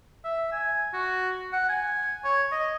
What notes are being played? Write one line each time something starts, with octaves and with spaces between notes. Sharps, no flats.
E5
G#5
F#4
F#5
G#5
C#5
D#5